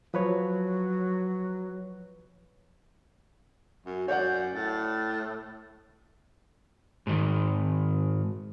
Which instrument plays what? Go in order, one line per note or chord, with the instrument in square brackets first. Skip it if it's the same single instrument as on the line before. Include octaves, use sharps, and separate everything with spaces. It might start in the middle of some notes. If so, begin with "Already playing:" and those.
[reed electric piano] F3 B4 C#5 [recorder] F#3
[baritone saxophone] F#2
[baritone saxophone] F#2 [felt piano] C#5 D5 F#5 [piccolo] G6
[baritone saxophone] A2 [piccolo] A6
[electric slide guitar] G#2 D#3